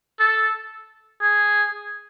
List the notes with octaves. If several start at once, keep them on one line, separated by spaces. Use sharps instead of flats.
A4
G#4